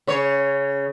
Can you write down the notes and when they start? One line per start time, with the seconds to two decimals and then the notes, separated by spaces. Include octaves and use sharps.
0.07 C#3 C#5